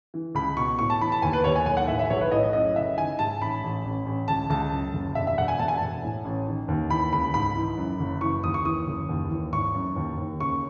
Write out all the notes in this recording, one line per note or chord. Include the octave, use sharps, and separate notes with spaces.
E3
C#2 B5
B2 C#6
A2 C#6
A5
E3 B5
A5
D#2 G#5
B4
D#2 C#5
G#5
B1 G#5
F#5
A2 E5
E5
B1 C#5
B4
A2 D#5
D#5
F#2 D#5
C#3 E5
D#3 G#5
G#2 A5
A1 B5
A1
A1
A1
C#2 A5
C#2 A5
F#2
F#1
E1 E5
E5
E1 F#5
G#5
E1 A5
G#5
E1 A5
A2
A1
D#3
D#2
E3 B5
C#2 B5
G#2 B5
E3
F#2
F#1
E3 C#6
D#2 D#6
C#6
E3 D#6
F#1
D#2
E3
G#1 C#6
F#2
D#2
D#2
C#3 C#6